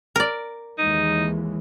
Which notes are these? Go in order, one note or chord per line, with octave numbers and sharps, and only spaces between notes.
A#4 D5
D#2 E3 G#3 D#4